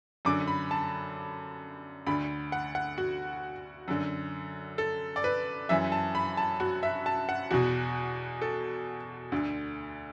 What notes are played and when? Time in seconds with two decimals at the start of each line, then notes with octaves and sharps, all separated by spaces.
0.25 F#2 D3 D6
0.48 B5
0.71 A5
2.06 D2 D3 B5
2.52 F#5
2.75 F#5
2.98 F#4
3.88 F#2 D3
4.78 A4
5.16 D5
5.24 B4
5.69 F#2 E3 E5
5.92 A5
6.15 B5
6.37 A5
6.60 F#4
6.83 E5
7.06 A5
7.29 F#5
7.51 E2 B2 F#4
8.42 A4
9.32 D2 D3